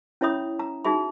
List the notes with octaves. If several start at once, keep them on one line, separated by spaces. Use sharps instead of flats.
C#4 E4 C#5 E5 B5 D#6
A#5
D#4 F#4 G#4 E5 B5